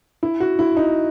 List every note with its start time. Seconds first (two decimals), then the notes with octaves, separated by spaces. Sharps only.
0.23 E4
0.40 F#4
0.59 E4
0.77 D#4